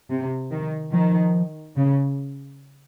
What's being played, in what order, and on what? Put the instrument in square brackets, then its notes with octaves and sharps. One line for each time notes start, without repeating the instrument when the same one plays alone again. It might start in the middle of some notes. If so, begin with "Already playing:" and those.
[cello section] C3
D#3
[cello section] D#3 [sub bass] F3
[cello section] C#3